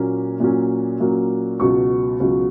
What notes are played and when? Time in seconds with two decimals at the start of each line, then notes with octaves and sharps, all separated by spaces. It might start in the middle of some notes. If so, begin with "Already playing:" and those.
Already playing: A#2 F#3 A#3 C#4
0.40 A#2 F#3 A#3 C#4
1.00 A#2 F#3 A#3 C#4
1.60 C#2 B2 F#3 C#6
2.20 C#2 B2 F#3